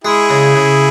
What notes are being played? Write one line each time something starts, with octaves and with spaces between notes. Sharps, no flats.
G#3 E4 G#4
C#3
C#3